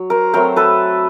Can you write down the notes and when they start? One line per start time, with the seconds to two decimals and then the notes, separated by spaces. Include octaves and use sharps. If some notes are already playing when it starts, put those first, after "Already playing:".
Already playing: F#3
0.10 A#4 C5
0.33 F#3 A3 C4 A#4 C5
0.56 A4 B4